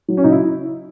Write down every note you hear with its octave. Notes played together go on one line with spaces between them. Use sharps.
F#3
C#4
C#3 D#4
E4